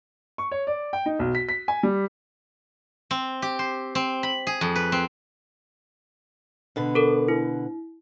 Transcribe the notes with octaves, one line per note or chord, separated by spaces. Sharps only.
C#6
C#5
D5
G5
D#4
B1
B6
B6
G#5
G3
C4
G4
C5
C4
B5
G#4
F2
B4
C4
B2 D3 B4
A4 A#4
E4